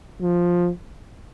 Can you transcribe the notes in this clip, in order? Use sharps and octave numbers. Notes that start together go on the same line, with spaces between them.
F3